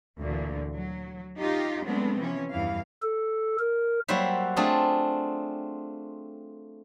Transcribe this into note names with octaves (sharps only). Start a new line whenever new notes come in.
D2 A#2 D3 E3
F#3
D#4 F4 G4
F#3 G#3 A3 B3 C4 D4
C3 E3 F3 C#4
E2 G2 E3 F5
A4
A#4
F#3 G3 A#3 F#4 C5 E5
A3 C4 D4 F4 G#4